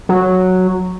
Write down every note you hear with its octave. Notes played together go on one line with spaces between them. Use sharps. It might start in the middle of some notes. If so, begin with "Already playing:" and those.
F#3